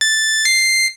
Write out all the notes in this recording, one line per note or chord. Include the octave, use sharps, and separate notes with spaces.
A6
C7